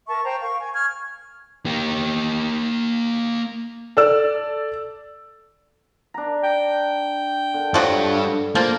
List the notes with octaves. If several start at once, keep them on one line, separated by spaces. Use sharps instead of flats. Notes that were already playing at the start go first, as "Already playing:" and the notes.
A#4 E5 A5 C#6
C5 G5 A#5
A#4 F5 C#6
G#5
C#6 F6 G#6
A#3 G4
A4 D5 E6
D4 A#5
G5
D3
G2 F3 F#3 F#4
F3 A#3